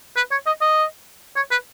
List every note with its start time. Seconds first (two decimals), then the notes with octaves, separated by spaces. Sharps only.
0.16 B4
0.31 C#5
0.46 D#5
0.61 D#5
1.36 C#5
1.51 B4